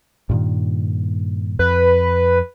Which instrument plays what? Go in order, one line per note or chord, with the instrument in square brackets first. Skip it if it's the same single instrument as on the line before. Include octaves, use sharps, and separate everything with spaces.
[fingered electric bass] G2 A#2 D#3
[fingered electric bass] F2 [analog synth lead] B4